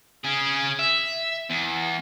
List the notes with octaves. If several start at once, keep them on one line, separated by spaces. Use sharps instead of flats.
C#4 G#4
E5
E2